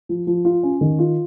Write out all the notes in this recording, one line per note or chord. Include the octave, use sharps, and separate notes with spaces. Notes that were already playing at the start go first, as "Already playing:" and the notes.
F3
F3
F4
C#4
D#3
F4